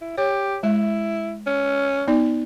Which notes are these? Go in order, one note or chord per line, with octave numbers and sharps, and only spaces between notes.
E4
G4 C#5
G#3 E4 E5
C#4
B3 D#4 D5